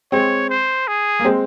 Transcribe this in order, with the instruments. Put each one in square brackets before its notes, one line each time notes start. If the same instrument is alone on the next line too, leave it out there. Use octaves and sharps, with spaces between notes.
[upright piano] G#3 C4 [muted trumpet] C#5
[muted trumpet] C5
G#4
[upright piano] A#3
G#3 C4